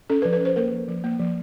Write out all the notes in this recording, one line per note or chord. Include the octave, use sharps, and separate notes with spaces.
C#4 A4
B4
F3
B4
C#4 C5
A#3 A#4
F3
F3
A#3
F3